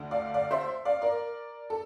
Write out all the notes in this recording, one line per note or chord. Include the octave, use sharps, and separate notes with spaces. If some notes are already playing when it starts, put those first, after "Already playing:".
Already playing: D2 D3 A3 D4
D5 F5
D5 F5
C5 E5
D5 F5
A#4 D5
A4